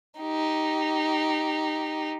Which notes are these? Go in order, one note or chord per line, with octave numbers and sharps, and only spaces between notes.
D#4 G4